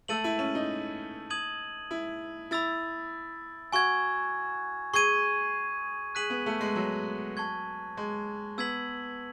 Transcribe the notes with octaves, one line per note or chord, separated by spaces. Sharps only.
A3 A5 E6 A6 D#7 F#7
E4
C#4
D#4
D#6 G#6 D#7 F#7
E4
E4 B5 E6 A6
F#4 G#5 C#6 G#6
G#4 C#6 G#6 D#7
G#4 F#6 B6 D#7 F#7
B3
A3
G#3
F#3
A5 C#6 G#6
G#3
B3 E6 G#6 B6 F#7